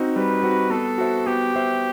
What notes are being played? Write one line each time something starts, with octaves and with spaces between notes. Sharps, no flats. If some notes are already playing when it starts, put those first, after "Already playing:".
Already playing: C4 D#4 F#4
G3 B4
C4 D#4 F#4
B3 A4
F#4 C5 E5
B3 G4
F#4 C5 E5